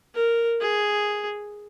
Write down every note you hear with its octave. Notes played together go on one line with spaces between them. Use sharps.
A#4
G#4